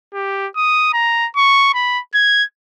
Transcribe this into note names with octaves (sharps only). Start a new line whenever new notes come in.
G4
D#6
A#5
C#6
B5
G#6